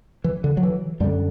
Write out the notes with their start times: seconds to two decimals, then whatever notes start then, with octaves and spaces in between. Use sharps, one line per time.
0.24 E3
0.44 D3
0.57 F#3
0.63 E3
1.00 F#2 G3
1.04 D3